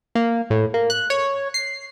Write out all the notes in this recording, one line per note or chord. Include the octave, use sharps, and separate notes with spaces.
A#3
A2
A#3
F#6
C#5
C7